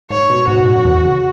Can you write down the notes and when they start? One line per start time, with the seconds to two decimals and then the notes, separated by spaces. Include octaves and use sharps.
0.10 G#2 C#5
0.30 B2
0.48 G#2 F#4
0.57 B2
0.66 G#2
0.75 F#2
0.85 E2
1.04 C#3